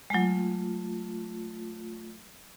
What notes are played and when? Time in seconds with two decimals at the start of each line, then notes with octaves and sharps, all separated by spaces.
0.10 F#3 G#3 A3 F4